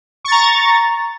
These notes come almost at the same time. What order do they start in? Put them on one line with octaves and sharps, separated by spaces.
C#6 A6 A#5